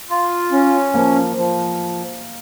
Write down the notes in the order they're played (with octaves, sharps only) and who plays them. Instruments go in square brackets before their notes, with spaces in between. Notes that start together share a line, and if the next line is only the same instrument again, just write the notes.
[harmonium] F4
C#4
[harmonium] F3 [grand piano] A#3
[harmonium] F3